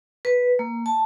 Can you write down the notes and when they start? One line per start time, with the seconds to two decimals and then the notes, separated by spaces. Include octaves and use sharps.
0.25 B4
0.59 A#3
0.86 A5